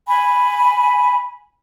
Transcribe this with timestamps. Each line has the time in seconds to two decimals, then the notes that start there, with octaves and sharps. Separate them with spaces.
0.06 G#5 B5